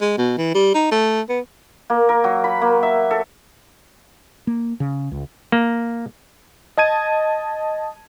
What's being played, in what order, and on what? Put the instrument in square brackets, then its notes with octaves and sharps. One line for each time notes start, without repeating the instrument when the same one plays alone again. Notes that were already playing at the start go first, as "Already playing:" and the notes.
[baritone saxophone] G#3
B2
E3
G3
D#4
A3
B3
[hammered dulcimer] A#3
A#4
F#3
B5
A#3
E5
A4
[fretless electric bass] A#3
C#3
C#2
[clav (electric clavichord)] A#3
[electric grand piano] D#5 A5 G#6 D#7